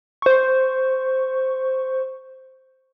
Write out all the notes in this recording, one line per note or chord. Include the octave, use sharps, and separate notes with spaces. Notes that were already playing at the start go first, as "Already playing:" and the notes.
C5 C#6